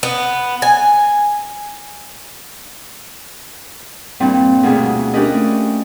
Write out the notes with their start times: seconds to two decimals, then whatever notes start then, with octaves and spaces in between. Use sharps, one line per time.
0.03 B3
0.62 G#5
4.20 G2 A#2 G3 C4 E4
4.63 D2 B2 F4 G#4
5.14 C#4 D4 G4 A#4 B4 D#5
5.34 A3